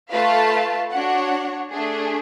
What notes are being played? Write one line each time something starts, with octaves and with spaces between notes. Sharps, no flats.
A3 F4 B4 F5 A5
D4 F#4 C#5 F#5
A3 D4 G#4